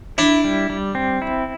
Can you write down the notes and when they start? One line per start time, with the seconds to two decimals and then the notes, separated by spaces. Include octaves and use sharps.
0.18 D4 E4
0.44 G3
0.70 G3
0.95 C4
1.22 E4